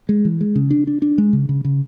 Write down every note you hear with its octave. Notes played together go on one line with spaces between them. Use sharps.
G#3
E3
G#3
C#3
D4
D4
D4
G#3
C#3
C#3
C#3